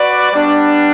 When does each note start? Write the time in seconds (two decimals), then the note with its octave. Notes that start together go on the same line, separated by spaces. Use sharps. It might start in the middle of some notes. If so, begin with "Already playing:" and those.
Already playing: F#4 B4 D5
0.33 G3 B3 D4